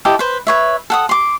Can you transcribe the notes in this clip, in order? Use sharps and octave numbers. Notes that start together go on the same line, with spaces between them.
E4 G4 A4 D#5
B4 C5
B4 C#5 E5
A4 F#5 D#6
C6 D6